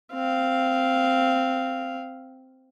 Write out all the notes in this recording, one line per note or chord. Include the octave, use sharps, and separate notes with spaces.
C4 F5